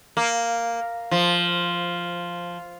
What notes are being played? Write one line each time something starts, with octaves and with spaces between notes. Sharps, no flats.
A#3
F3